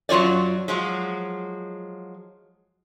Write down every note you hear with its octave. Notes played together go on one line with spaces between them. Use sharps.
F#2 F#3 F4 C#5 D5
F3 F#3 G#3